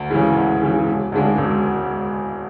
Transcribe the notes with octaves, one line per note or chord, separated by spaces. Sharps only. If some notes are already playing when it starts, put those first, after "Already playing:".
Already playing: D2
C#3 E3 G#3
D2
C#3 E3 G#3
E1
D2 C#3 G#3 D4
E1